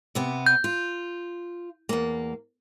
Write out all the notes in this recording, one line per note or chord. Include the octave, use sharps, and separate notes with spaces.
C3 B3
G6
F4
E2 A#3